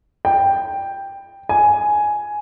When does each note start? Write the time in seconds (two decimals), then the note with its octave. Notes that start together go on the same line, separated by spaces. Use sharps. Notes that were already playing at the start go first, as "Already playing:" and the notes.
0.25 G5
1.49 G#5